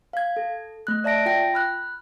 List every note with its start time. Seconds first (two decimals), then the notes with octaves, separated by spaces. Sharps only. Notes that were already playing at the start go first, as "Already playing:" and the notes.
0.13 F5 G#6
0.37 A4
0.87 A3 F#6
1.04 D5 E5 A5 A#6 D7
1.26 F4 G5 A#6
1.54 B5 F6 F#6